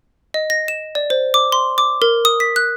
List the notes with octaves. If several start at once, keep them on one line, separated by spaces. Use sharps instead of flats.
D#5
A#6
E7
D5
C5
D6
C6
D6
A#4
D#6
B6
F#6